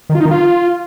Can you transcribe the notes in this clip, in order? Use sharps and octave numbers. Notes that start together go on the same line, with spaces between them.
D#3
F4
D#4
D#3
F4